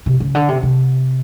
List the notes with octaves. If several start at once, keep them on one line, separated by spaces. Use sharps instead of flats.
C3
C#3
D3
C3
C3